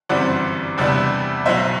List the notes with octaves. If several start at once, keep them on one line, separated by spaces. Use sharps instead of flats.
G1 F#2 E3 G3 C4 D5 F#5
E2 C3 G3 B3 D4
B1 B2 F#3 C5 E5